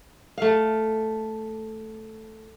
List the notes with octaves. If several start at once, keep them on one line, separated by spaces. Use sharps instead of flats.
A3 F5